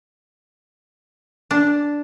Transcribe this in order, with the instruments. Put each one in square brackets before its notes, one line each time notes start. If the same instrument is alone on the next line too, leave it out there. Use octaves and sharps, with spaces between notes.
[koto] D4